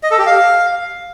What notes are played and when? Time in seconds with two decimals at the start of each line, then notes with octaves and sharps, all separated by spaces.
0.03 D#5
0.11 A4
0.19 G4
0.26 F5